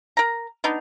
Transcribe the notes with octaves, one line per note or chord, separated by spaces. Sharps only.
A#4 A#5
B3 D4 D#4